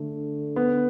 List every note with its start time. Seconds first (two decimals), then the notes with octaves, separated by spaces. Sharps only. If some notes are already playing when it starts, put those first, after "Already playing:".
Already playing: D3 A3
0.56 B3